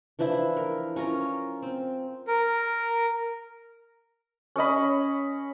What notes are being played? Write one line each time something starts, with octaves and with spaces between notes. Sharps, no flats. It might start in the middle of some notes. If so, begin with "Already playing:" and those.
E3 F3 D4 E4
A#4
C#4 F4 A#4 A#5
C4
A#4
C#4 C#5 D#5 B5